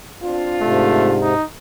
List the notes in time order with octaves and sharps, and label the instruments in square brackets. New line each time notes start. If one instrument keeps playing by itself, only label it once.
[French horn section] C4 D4 F4
[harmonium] G#2 C3 [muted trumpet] A3
[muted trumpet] D#4